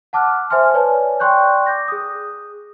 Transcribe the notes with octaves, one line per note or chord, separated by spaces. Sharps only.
F#5 A5 D6 F6 F#6
C5 E5 G#5 C6 F6
B4 C#5 D5 G#5 A5
D5 G5 C6 C#6 F#6 G6
D6 G6 A#6
G#4 D#6